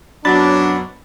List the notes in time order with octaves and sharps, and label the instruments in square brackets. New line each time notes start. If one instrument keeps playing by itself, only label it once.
[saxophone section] F#2 B2 F#3 [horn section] D4 [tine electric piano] B5 A6